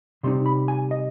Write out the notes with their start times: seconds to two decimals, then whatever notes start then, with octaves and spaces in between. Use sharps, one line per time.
0.23 C3 G3 C4 D#4 C6
0.46 B5
0.68 G#5
0.91 D#5